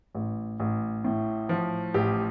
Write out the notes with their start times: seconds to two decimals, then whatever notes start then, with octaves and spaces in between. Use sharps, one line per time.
0.15 A1
0.60 A1
1.04 A2
1.49 F3
1.94 A1 G4